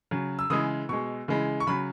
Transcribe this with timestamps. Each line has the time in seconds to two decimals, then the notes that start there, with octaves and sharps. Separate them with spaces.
0.11 C#3 F#3
0.39 E6
0.50 C#3 E3 G#3 D#6
0.89 B2 G#3 C#6
1.28 C#3 E3 G#3
1.60 C#6
1.67 C#3 F#3 B5